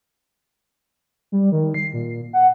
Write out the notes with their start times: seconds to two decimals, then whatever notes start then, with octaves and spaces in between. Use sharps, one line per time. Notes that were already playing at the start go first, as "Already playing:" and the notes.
1.32 G3
1.52 D#3
1.74 C7
1.93 A#2
2.33 F#5